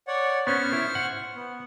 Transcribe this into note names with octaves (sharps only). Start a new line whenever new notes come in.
C#5 D5 F#5
B3 C#4 C5 C#6 F6
E4
F#5
B3